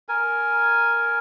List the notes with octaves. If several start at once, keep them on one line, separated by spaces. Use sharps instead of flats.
A#4 G#5